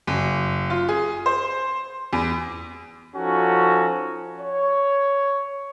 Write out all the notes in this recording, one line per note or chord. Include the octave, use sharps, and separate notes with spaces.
F#1
F4
G#4
C5
E2
F3 C#4 D#4 F#4 A4
C#5